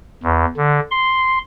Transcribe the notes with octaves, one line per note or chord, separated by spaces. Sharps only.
E2
D3
C6